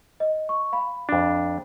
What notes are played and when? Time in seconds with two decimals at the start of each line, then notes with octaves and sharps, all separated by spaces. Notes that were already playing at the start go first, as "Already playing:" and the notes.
0.20 D#5
0.49 C#6
0.73 F5 B5
1.09 F2 D4